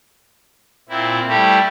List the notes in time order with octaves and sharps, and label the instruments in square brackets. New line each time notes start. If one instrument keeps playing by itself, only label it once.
[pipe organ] A#2 C4 E4
G3 A3 E4 G4